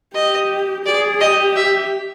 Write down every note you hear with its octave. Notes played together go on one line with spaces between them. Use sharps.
G4 D#5
G#4 D5
G4 D#5
E5